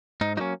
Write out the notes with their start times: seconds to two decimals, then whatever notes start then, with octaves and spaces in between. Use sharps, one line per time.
0.21 G#2 D#4
0.37 F#3 A#3 C#4 D#4